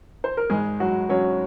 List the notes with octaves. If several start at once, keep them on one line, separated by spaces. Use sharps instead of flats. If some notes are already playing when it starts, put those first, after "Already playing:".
C5
A#4
G#1 G#3 G#4
F#3 F#4
F#3 C#4 C#5